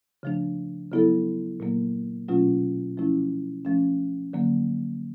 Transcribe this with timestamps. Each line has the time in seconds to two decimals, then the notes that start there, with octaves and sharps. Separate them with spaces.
0.23 C#3 F3 A3 D4
0.91 C#3 F#3 B3 E4 A4
1.60 A#2 F#3 A#3
2.28 B2 F#3 A3 C#4 F4
2.97 F3 A3 C#4 E4
3.65 F3 A3 C#4
4.33 D3 F#3 A#3